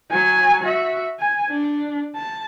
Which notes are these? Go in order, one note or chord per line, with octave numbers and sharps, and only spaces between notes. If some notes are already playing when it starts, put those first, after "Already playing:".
F#3 G#5
F#4 E5
G#5
D4
A5